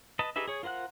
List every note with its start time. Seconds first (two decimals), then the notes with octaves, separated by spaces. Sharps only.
0.19 B4 D#5 A5
0.36 D#4 G4 G#4 B4 E5
0.48 G#4 C#5
0.63 F4 A#4 C5 F#5 F#6